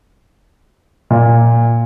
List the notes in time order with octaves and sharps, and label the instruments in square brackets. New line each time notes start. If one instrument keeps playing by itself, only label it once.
[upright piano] A#2